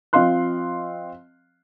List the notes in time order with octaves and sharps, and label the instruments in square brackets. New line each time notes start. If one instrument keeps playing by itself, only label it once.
[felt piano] F3 C4 D#5 F5 C6 F#6